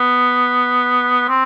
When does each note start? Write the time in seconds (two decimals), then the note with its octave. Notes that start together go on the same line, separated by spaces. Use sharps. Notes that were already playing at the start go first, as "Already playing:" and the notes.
Already playing: B3
1.29 C4